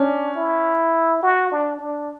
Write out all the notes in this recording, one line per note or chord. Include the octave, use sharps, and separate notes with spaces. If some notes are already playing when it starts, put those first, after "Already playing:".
Already playing: C#4 D4
E4
F#4
D4
D4